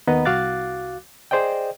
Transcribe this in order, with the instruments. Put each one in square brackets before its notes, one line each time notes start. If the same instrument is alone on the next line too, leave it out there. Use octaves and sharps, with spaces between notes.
[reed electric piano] D#2 D#3 B3 B4 D#5 A#5
C2 F#4 F5 D6 F#6 A6
G#4 C5 D5 D#5 G5